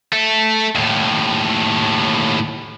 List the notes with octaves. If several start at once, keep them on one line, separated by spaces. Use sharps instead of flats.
A3
D#2 A2